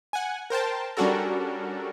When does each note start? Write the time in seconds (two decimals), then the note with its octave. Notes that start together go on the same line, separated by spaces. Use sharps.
0.13 F#5 G#5
0.50 A#4 C5 G5 A5
0.97 G3 C#4 D4 F#4 A4 A#4